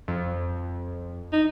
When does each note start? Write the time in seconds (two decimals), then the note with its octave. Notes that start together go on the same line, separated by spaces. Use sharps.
0.08 F2
1.33 D#4